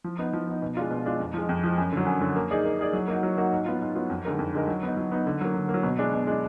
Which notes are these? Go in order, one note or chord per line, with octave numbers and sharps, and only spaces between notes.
F3
B3 D#4
F3
B3 D#4
B2
G#3 D4 F4
B2
G#3 D4 F4
F2
F3 G#3
F2
F3 G#3
F#2
D3 F#3
F#2
D3 F#3
A#3
D#4 G#4 D5
A#3
D#4 G#4 D5
F#3
A#3 D#4 F#4
F#3
A#3 D#4 F#4
G#2
F#3 B3 F4
G#2
F#3 B3 F4
F2
D3 G#3 D#4 A#4
F2
D3 G#3 D#4 A#4
F#3
B3 D#4
F#3
B3 D#4
D3
F#3 A#3
D3
A#3
F#3
B2
G#3 D4
B2
G#3 D4